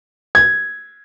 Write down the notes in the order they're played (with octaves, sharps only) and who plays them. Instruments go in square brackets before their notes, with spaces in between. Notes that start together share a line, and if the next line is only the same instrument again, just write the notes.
[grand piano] G#6